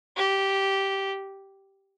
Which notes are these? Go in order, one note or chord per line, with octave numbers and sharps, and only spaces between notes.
G4